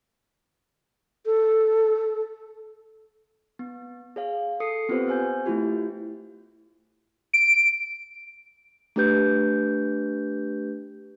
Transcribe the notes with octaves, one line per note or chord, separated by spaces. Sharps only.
A4
B3
G#4 C#5 F5
A4 D#6 C7 C#7
B3 C4 F4 G4 B4 C5
B3 C5 G#5 G6
A3 E4 F4 G4
D7
A3 D4 G4 B4 G6